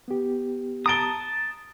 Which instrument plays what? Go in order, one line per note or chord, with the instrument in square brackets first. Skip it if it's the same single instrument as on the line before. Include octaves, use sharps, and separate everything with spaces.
[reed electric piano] B3 G4
[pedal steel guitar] A5 D#6 [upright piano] A#5 D7 G7